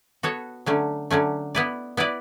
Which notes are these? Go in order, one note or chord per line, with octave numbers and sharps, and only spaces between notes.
B3 F#4 A4 C#5
D3 F#3 A3 C#4
D3 F#3 A3 C#4
B3 E4 B4 D5
B3 E4 B4 D5